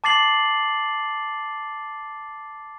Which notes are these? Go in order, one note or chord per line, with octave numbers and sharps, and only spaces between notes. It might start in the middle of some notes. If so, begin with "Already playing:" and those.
A5 D6 A6 C7 F#7